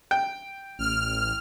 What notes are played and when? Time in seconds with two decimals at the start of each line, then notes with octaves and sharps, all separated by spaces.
0.11 G5
0.79 A1 F6